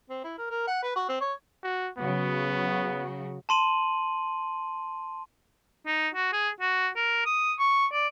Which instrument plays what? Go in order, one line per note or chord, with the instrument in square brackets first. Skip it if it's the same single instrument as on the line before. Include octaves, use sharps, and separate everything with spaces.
[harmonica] C4
E4
A#4
A#4
F#5
B4
F#4
C4
C#5
[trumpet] F#4
[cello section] C#3 F#3 F#4 [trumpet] B3
[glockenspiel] A5 C6 D#7 F#7
[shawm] D#4
F#4
G#4
F#4
A#4
D#6
C#6
D5